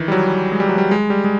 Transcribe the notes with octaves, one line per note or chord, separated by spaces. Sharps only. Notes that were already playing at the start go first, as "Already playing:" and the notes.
Already playing: D#3 E3
G3
F#3
G#3
G3
F#3
G3
G#3
G3
G#3